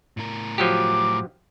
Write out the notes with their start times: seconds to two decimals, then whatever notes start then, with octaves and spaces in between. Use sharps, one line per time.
0.17 A2 A#4
0.58 F3 F#3 G4 D6